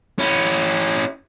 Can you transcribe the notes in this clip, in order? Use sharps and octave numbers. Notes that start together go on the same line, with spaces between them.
C#4 E4